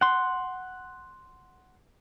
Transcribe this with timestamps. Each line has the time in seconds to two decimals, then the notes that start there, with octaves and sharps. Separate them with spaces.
0.01 F#5 C6